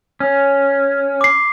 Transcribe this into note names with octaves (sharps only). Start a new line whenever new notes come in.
C#4
D6 C7